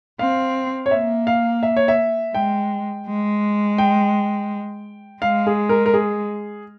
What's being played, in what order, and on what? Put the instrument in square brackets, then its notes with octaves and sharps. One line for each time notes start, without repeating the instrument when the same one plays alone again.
[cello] C4 [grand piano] F5
[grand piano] C#5
[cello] A#3 [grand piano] E5
[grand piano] F5
E5
C#5
E5
[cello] G#3 [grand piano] G5
[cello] G#3
[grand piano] G5
[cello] G#3 [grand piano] F5
[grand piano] G#4
A#4
A#4
G#4